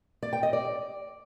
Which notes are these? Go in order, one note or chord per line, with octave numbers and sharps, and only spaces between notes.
D5
G5
D#5
D5